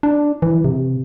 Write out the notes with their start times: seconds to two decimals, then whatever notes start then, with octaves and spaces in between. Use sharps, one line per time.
0.03 D4
0.42 E3
0.65 C3